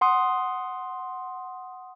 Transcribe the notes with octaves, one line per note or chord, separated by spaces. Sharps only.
F#5 C6 D#6